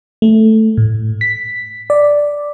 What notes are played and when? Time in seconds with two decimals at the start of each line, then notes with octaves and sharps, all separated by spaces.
0.22 A3
0.78 A2
1.21 B6
1.90 D5